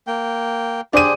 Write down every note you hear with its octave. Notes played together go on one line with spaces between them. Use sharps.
A#3 G5
D4 G4 G#4 C5 D#7